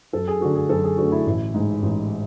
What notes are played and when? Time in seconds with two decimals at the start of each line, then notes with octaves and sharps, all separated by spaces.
0.13 F#2 A4
0.28 G#4
0.40 D3 A3 F#4
0.55 G#4
0.69 F#2 A4
0.84 G#4
0.97 D3 A3 F#4
1.12 E4
1.26 A1
1.54 G#2 G#3
1.82 A1